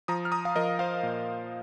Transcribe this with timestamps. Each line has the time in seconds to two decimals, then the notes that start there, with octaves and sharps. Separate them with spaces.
0.08 F3 A#5 D#6
0.25 F6
0.32 A#5 D#6
0.45 F5
0.56 F3 A#4 D#5
0.79 C5 F5
1.03 A#2